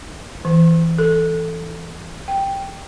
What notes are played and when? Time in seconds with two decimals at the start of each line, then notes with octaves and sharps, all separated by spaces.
0.45 E3
0.98 A4
2.28 G5